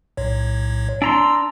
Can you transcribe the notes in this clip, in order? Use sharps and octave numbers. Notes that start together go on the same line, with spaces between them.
B1 A2 C#5
D4 A#5 C6 E6